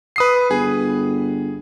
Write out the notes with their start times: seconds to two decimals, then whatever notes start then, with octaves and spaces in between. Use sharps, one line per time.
0.16 B4 D#6 C7
0.51 G1 G#4